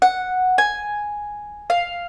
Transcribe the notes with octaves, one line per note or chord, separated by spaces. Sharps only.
F#5
G#5
F5